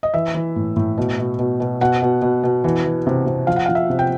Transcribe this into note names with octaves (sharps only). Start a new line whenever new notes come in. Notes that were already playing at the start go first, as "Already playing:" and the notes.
D#5
E3 E5
E3
A2
A2
B2
B2
B2
B2
B2 F#5
B2
B2
B2
E3
E3
C3
C3
F3 F5
F#5
F5
F3
E5
C3
G5